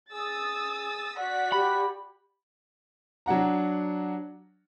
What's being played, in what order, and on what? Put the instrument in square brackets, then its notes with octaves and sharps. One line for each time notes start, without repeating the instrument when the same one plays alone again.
[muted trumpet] G#4 [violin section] D#6 E6 A6
[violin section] F#4 D5 B6 [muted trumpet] F#5
[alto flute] G4 [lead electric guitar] B5
[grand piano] F#3 D4 F#5 A#5